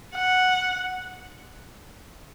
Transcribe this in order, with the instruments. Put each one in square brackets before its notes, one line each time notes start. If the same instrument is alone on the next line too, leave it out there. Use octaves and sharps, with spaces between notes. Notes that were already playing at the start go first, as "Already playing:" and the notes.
[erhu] F#5